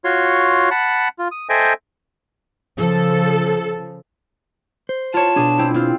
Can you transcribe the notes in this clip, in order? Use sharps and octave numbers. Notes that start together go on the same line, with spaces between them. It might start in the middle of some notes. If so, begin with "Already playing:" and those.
F4 F#4 C#5 C6
F#5 A5 B5
F4
D#6
A4 C5 D#5 E5 G5 G#5
C#3 F3 A4
C5
F4 C#5 A5
B2 D4 G#4
C4 E4
C4 F4